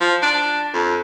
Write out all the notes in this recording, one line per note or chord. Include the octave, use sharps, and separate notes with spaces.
F3
D4
F2